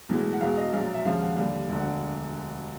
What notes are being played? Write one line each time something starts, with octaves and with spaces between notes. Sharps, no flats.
B1 A2 E3 G#3
F#5
E1 E2 B2 G#3 F5
D#5
A#1 A#2 F#3 F5
E5
D#2 C#3 F3 G#3 F5
F#5
D#2 D3 G3 F5
E1 D2 D3
F#5